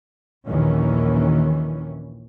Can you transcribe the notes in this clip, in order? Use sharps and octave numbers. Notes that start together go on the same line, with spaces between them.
A#1 D#2 D#3 E3 C#4